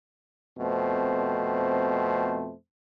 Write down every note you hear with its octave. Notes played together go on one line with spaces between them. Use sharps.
F2 B2 A3 C4 C5